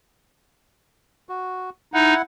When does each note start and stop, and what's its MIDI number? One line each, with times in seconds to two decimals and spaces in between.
1.29 1.70 66
1.94 2.14 63
1.94 2.22 64
1.94 2.22 78